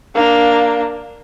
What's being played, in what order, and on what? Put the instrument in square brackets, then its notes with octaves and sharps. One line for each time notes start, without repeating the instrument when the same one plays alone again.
[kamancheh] A#3 D4